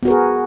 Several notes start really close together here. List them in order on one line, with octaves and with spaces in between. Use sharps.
B3 F#4 A#4 G#4